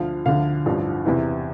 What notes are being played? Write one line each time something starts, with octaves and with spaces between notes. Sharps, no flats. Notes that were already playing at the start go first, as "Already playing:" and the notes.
Already playing: D2 D3 F3 F5
D2 D3 F3 F5
A1 G2 D3 F3
E2 C3 E3